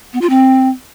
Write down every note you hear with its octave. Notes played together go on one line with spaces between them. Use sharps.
B3
F4
C4